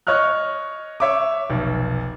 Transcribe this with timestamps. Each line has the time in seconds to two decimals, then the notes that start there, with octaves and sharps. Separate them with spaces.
0.07 C#5 D#5 C#6 F6 F#6
1.00 C#5 E5 C#6 D6
1.50 F1 B1